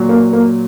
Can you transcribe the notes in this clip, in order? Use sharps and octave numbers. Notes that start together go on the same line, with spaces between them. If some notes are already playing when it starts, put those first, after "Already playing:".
Already playing: A#2 F#3
A#3
A#3